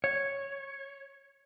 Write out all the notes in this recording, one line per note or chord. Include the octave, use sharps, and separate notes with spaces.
C#5